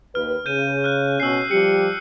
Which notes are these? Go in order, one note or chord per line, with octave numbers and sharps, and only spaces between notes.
D#2 B4 F6
C#3 G6 D#7
F6 F#6
B2 C#4 E6 C7
F3 G3 G4 C#7